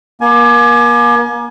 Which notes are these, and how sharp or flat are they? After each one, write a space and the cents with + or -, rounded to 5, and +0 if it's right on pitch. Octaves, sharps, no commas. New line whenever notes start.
A#3 +35 G#5 +25